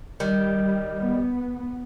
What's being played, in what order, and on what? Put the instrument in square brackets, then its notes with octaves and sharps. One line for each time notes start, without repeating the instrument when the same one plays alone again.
[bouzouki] D#3 [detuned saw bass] G3
[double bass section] B3